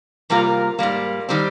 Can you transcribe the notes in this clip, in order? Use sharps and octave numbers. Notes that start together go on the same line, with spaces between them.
C3 G3 A#3 F4 A#4
G#2 G3 A#3
D#3 G3 C4